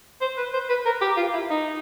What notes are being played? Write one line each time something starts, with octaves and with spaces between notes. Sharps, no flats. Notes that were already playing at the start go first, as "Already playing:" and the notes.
C5
B4
C5
B4
A#4
G4
F4
E4
D#4